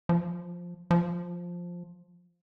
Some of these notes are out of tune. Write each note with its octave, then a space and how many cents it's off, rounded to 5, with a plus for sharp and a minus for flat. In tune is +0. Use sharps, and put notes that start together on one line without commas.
F3 +5
F3 +5